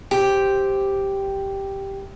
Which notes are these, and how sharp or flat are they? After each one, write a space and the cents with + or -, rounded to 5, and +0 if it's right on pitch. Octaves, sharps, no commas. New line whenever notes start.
G4 +0 C5 +0